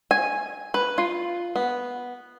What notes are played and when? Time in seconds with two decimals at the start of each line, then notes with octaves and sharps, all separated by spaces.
0.11 G#5
0.74 B4
0.98 F4
1.56 B3